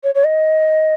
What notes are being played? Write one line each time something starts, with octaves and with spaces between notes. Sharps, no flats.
C#5
C#5
D#5